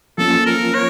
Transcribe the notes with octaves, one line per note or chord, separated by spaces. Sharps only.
F3 A#3 C#4 F4 A4
A#4
C#5